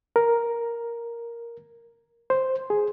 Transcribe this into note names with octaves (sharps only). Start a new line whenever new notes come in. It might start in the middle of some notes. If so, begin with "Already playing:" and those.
A#4
C5
G#4